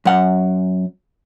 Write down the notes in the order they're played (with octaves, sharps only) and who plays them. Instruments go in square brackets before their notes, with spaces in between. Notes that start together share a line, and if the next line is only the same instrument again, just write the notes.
[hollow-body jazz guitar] F#2 F#5